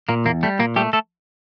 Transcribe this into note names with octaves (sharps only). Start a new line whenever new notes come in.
A#2 A#3
E2 A#3
G3 A3
A#2 A#3
G3 A3 G4
A3 A4